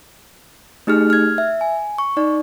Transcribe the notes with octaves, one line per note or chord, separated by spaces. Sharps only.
A3 D#4 G4 G#4 F6
F6 G#6
E5
G#5
C#6
D#4 D5